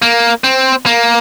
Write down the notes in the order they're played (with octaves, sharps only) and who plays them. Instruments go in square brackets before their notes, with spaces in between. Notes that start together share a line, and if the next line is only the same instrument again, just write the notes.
[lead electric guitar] A#3
C4
A#3